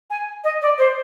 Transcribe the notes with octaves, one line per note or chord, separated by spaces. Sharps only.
G#5
D#5
D5
C5